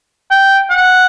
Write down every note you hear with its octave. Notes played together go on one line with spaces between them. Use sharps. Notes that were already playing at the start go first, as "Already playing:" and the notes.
G5
F#5